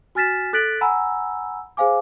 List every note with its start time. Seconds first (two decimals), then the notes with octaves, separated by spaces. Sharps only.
0.15 F#4 G#5 F6 A6 B6 E7
0.53 A4 F#6 A6 B6 D7 F#7
0.81 F#5 G#5 A#5 B5 E6
1.77 G#4 C5 F5 G#5 D6